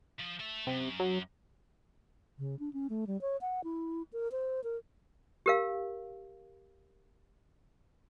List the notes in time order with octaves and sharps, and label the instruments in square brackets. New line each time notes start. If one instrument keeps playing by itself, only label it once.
[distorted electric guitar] F3
A4 E5
[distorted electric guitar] F#2 [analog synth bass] C3
[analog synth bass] F#3
[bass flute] C#3
D4
C#4
A3
G3
C#5
F#5
E4
A#4
C5
A#4
[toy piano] G4 A#4 F5